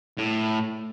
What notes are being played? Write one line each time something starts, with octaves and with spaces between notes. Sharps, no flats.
A2 A3